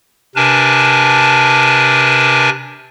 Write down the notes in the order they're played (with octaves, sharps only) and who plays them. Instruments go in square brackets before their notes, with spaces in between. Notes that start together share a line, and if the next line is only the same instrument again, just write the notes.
[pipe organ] C3 D4 A#4 B4 G#5 A5